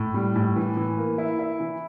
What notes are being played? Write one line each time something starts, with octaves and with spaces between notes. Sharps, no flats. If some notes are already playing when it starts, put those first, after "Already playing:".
Already playing: A2
G3
A2
E3
E3
A#3
E4
E4
E3